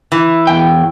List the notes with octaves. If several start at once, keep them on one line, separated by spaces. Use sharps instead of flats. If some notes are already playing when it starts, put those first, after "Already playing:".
E3
E2 G5